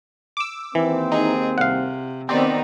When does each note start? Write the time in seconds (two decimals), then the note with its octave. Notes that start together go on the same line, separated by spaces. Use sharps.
0.37 D6 E6
0.75 D#2 E3 A#3 C4
1.12 D#4 G#4
1.58 C2 C3 F5 F#5
2.29 D#3 B3 C4 D#4 G4 D5